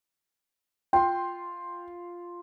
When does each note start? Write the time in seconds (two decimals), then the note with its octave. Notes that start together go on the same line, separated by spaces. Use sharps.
0.93 F4 G5 C6